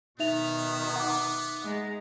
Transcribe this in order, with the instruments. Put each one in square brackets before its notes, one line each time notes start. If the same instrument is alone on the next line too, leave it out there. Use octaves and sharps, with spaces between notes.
[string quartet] B2 D#3 [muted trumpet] B3 [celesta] D#4 E5 F7
[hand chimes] F#5 D6
[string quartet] G#3 A#5